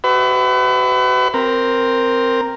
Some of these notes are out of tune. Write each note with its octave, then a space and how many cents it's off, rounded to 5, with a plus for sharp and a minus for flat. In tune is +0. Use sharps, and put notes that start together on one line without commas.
F#4 +35 B4 +35 E5 -10
C4 +5 A#4 +0